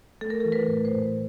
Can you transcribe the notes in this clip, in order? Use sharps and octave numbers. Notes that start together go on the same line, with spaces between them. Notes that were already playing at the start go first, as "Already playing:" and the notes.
A3 A4
A#4
E3 A4
B4
A2
C5
A2